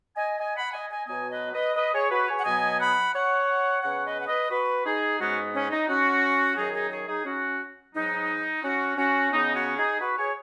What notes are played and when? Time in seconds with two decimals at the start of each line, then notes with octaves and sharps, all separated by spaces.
0.15 D#5 G#5
0.39 D#5 G#5
0.56 F#5 B5
0.73 D#5 G#5
0.90 D#5 G#5
1.07 B2 F#3 B3 D#5 G#5
1.31 B4 D#5
1.53 B4 D#5
1.76 B4 D#5
1.93 G#4 C#5
2.11 F#4 B4
2.27 G#4 C#5
2.38 F#5
2.44 B2 F#3 B3 D#5 G#5
2.79 F#5 B5
3.14 C#5 F#5
3.82 C#3 B3 C#5 F#5
4.04 B4 D#5
4.21 F#5
4.27 B4 D#5
4.50 F#4 B4
4.85 D#4 G#4
5.19 G#2 G#3 B3 C#4 F#4
5.54 C#4
5.71 D#4
5.88 C#4 F#4
6.56 F#2 D#3 F#3 D#4 G#4
6.73 D#4 G#4
6.91 G#4 C#5
7.08 D#4 G#4
7.25 C#4 F#4
7.94 G#2 F#3 B3 D#4
8.63 C#4 F#4
8.97 C#4 F#4
9.32 C#3 B3 D#4
9.54 C#4 F#4
9.77 D#4 G#4
10.00 F#4 B4
10.18 G#4 C#5